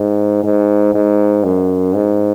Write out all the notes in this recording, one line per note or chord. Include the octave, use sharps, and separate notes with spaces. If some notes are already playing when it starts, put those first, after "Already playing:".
Already playing: G#2
G#2
G#2
F#2
G#2